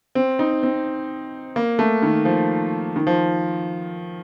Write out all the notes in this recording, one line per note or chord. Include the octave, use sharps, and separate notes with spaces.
C4
D#4
C4
A#3
A3
D#3
F3
D#3
F3